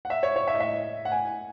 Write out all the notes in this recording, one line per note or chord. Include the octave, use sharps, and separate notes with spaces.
F#5
E5
C#5
C#5
E5
D#5
E5
F#5
G#5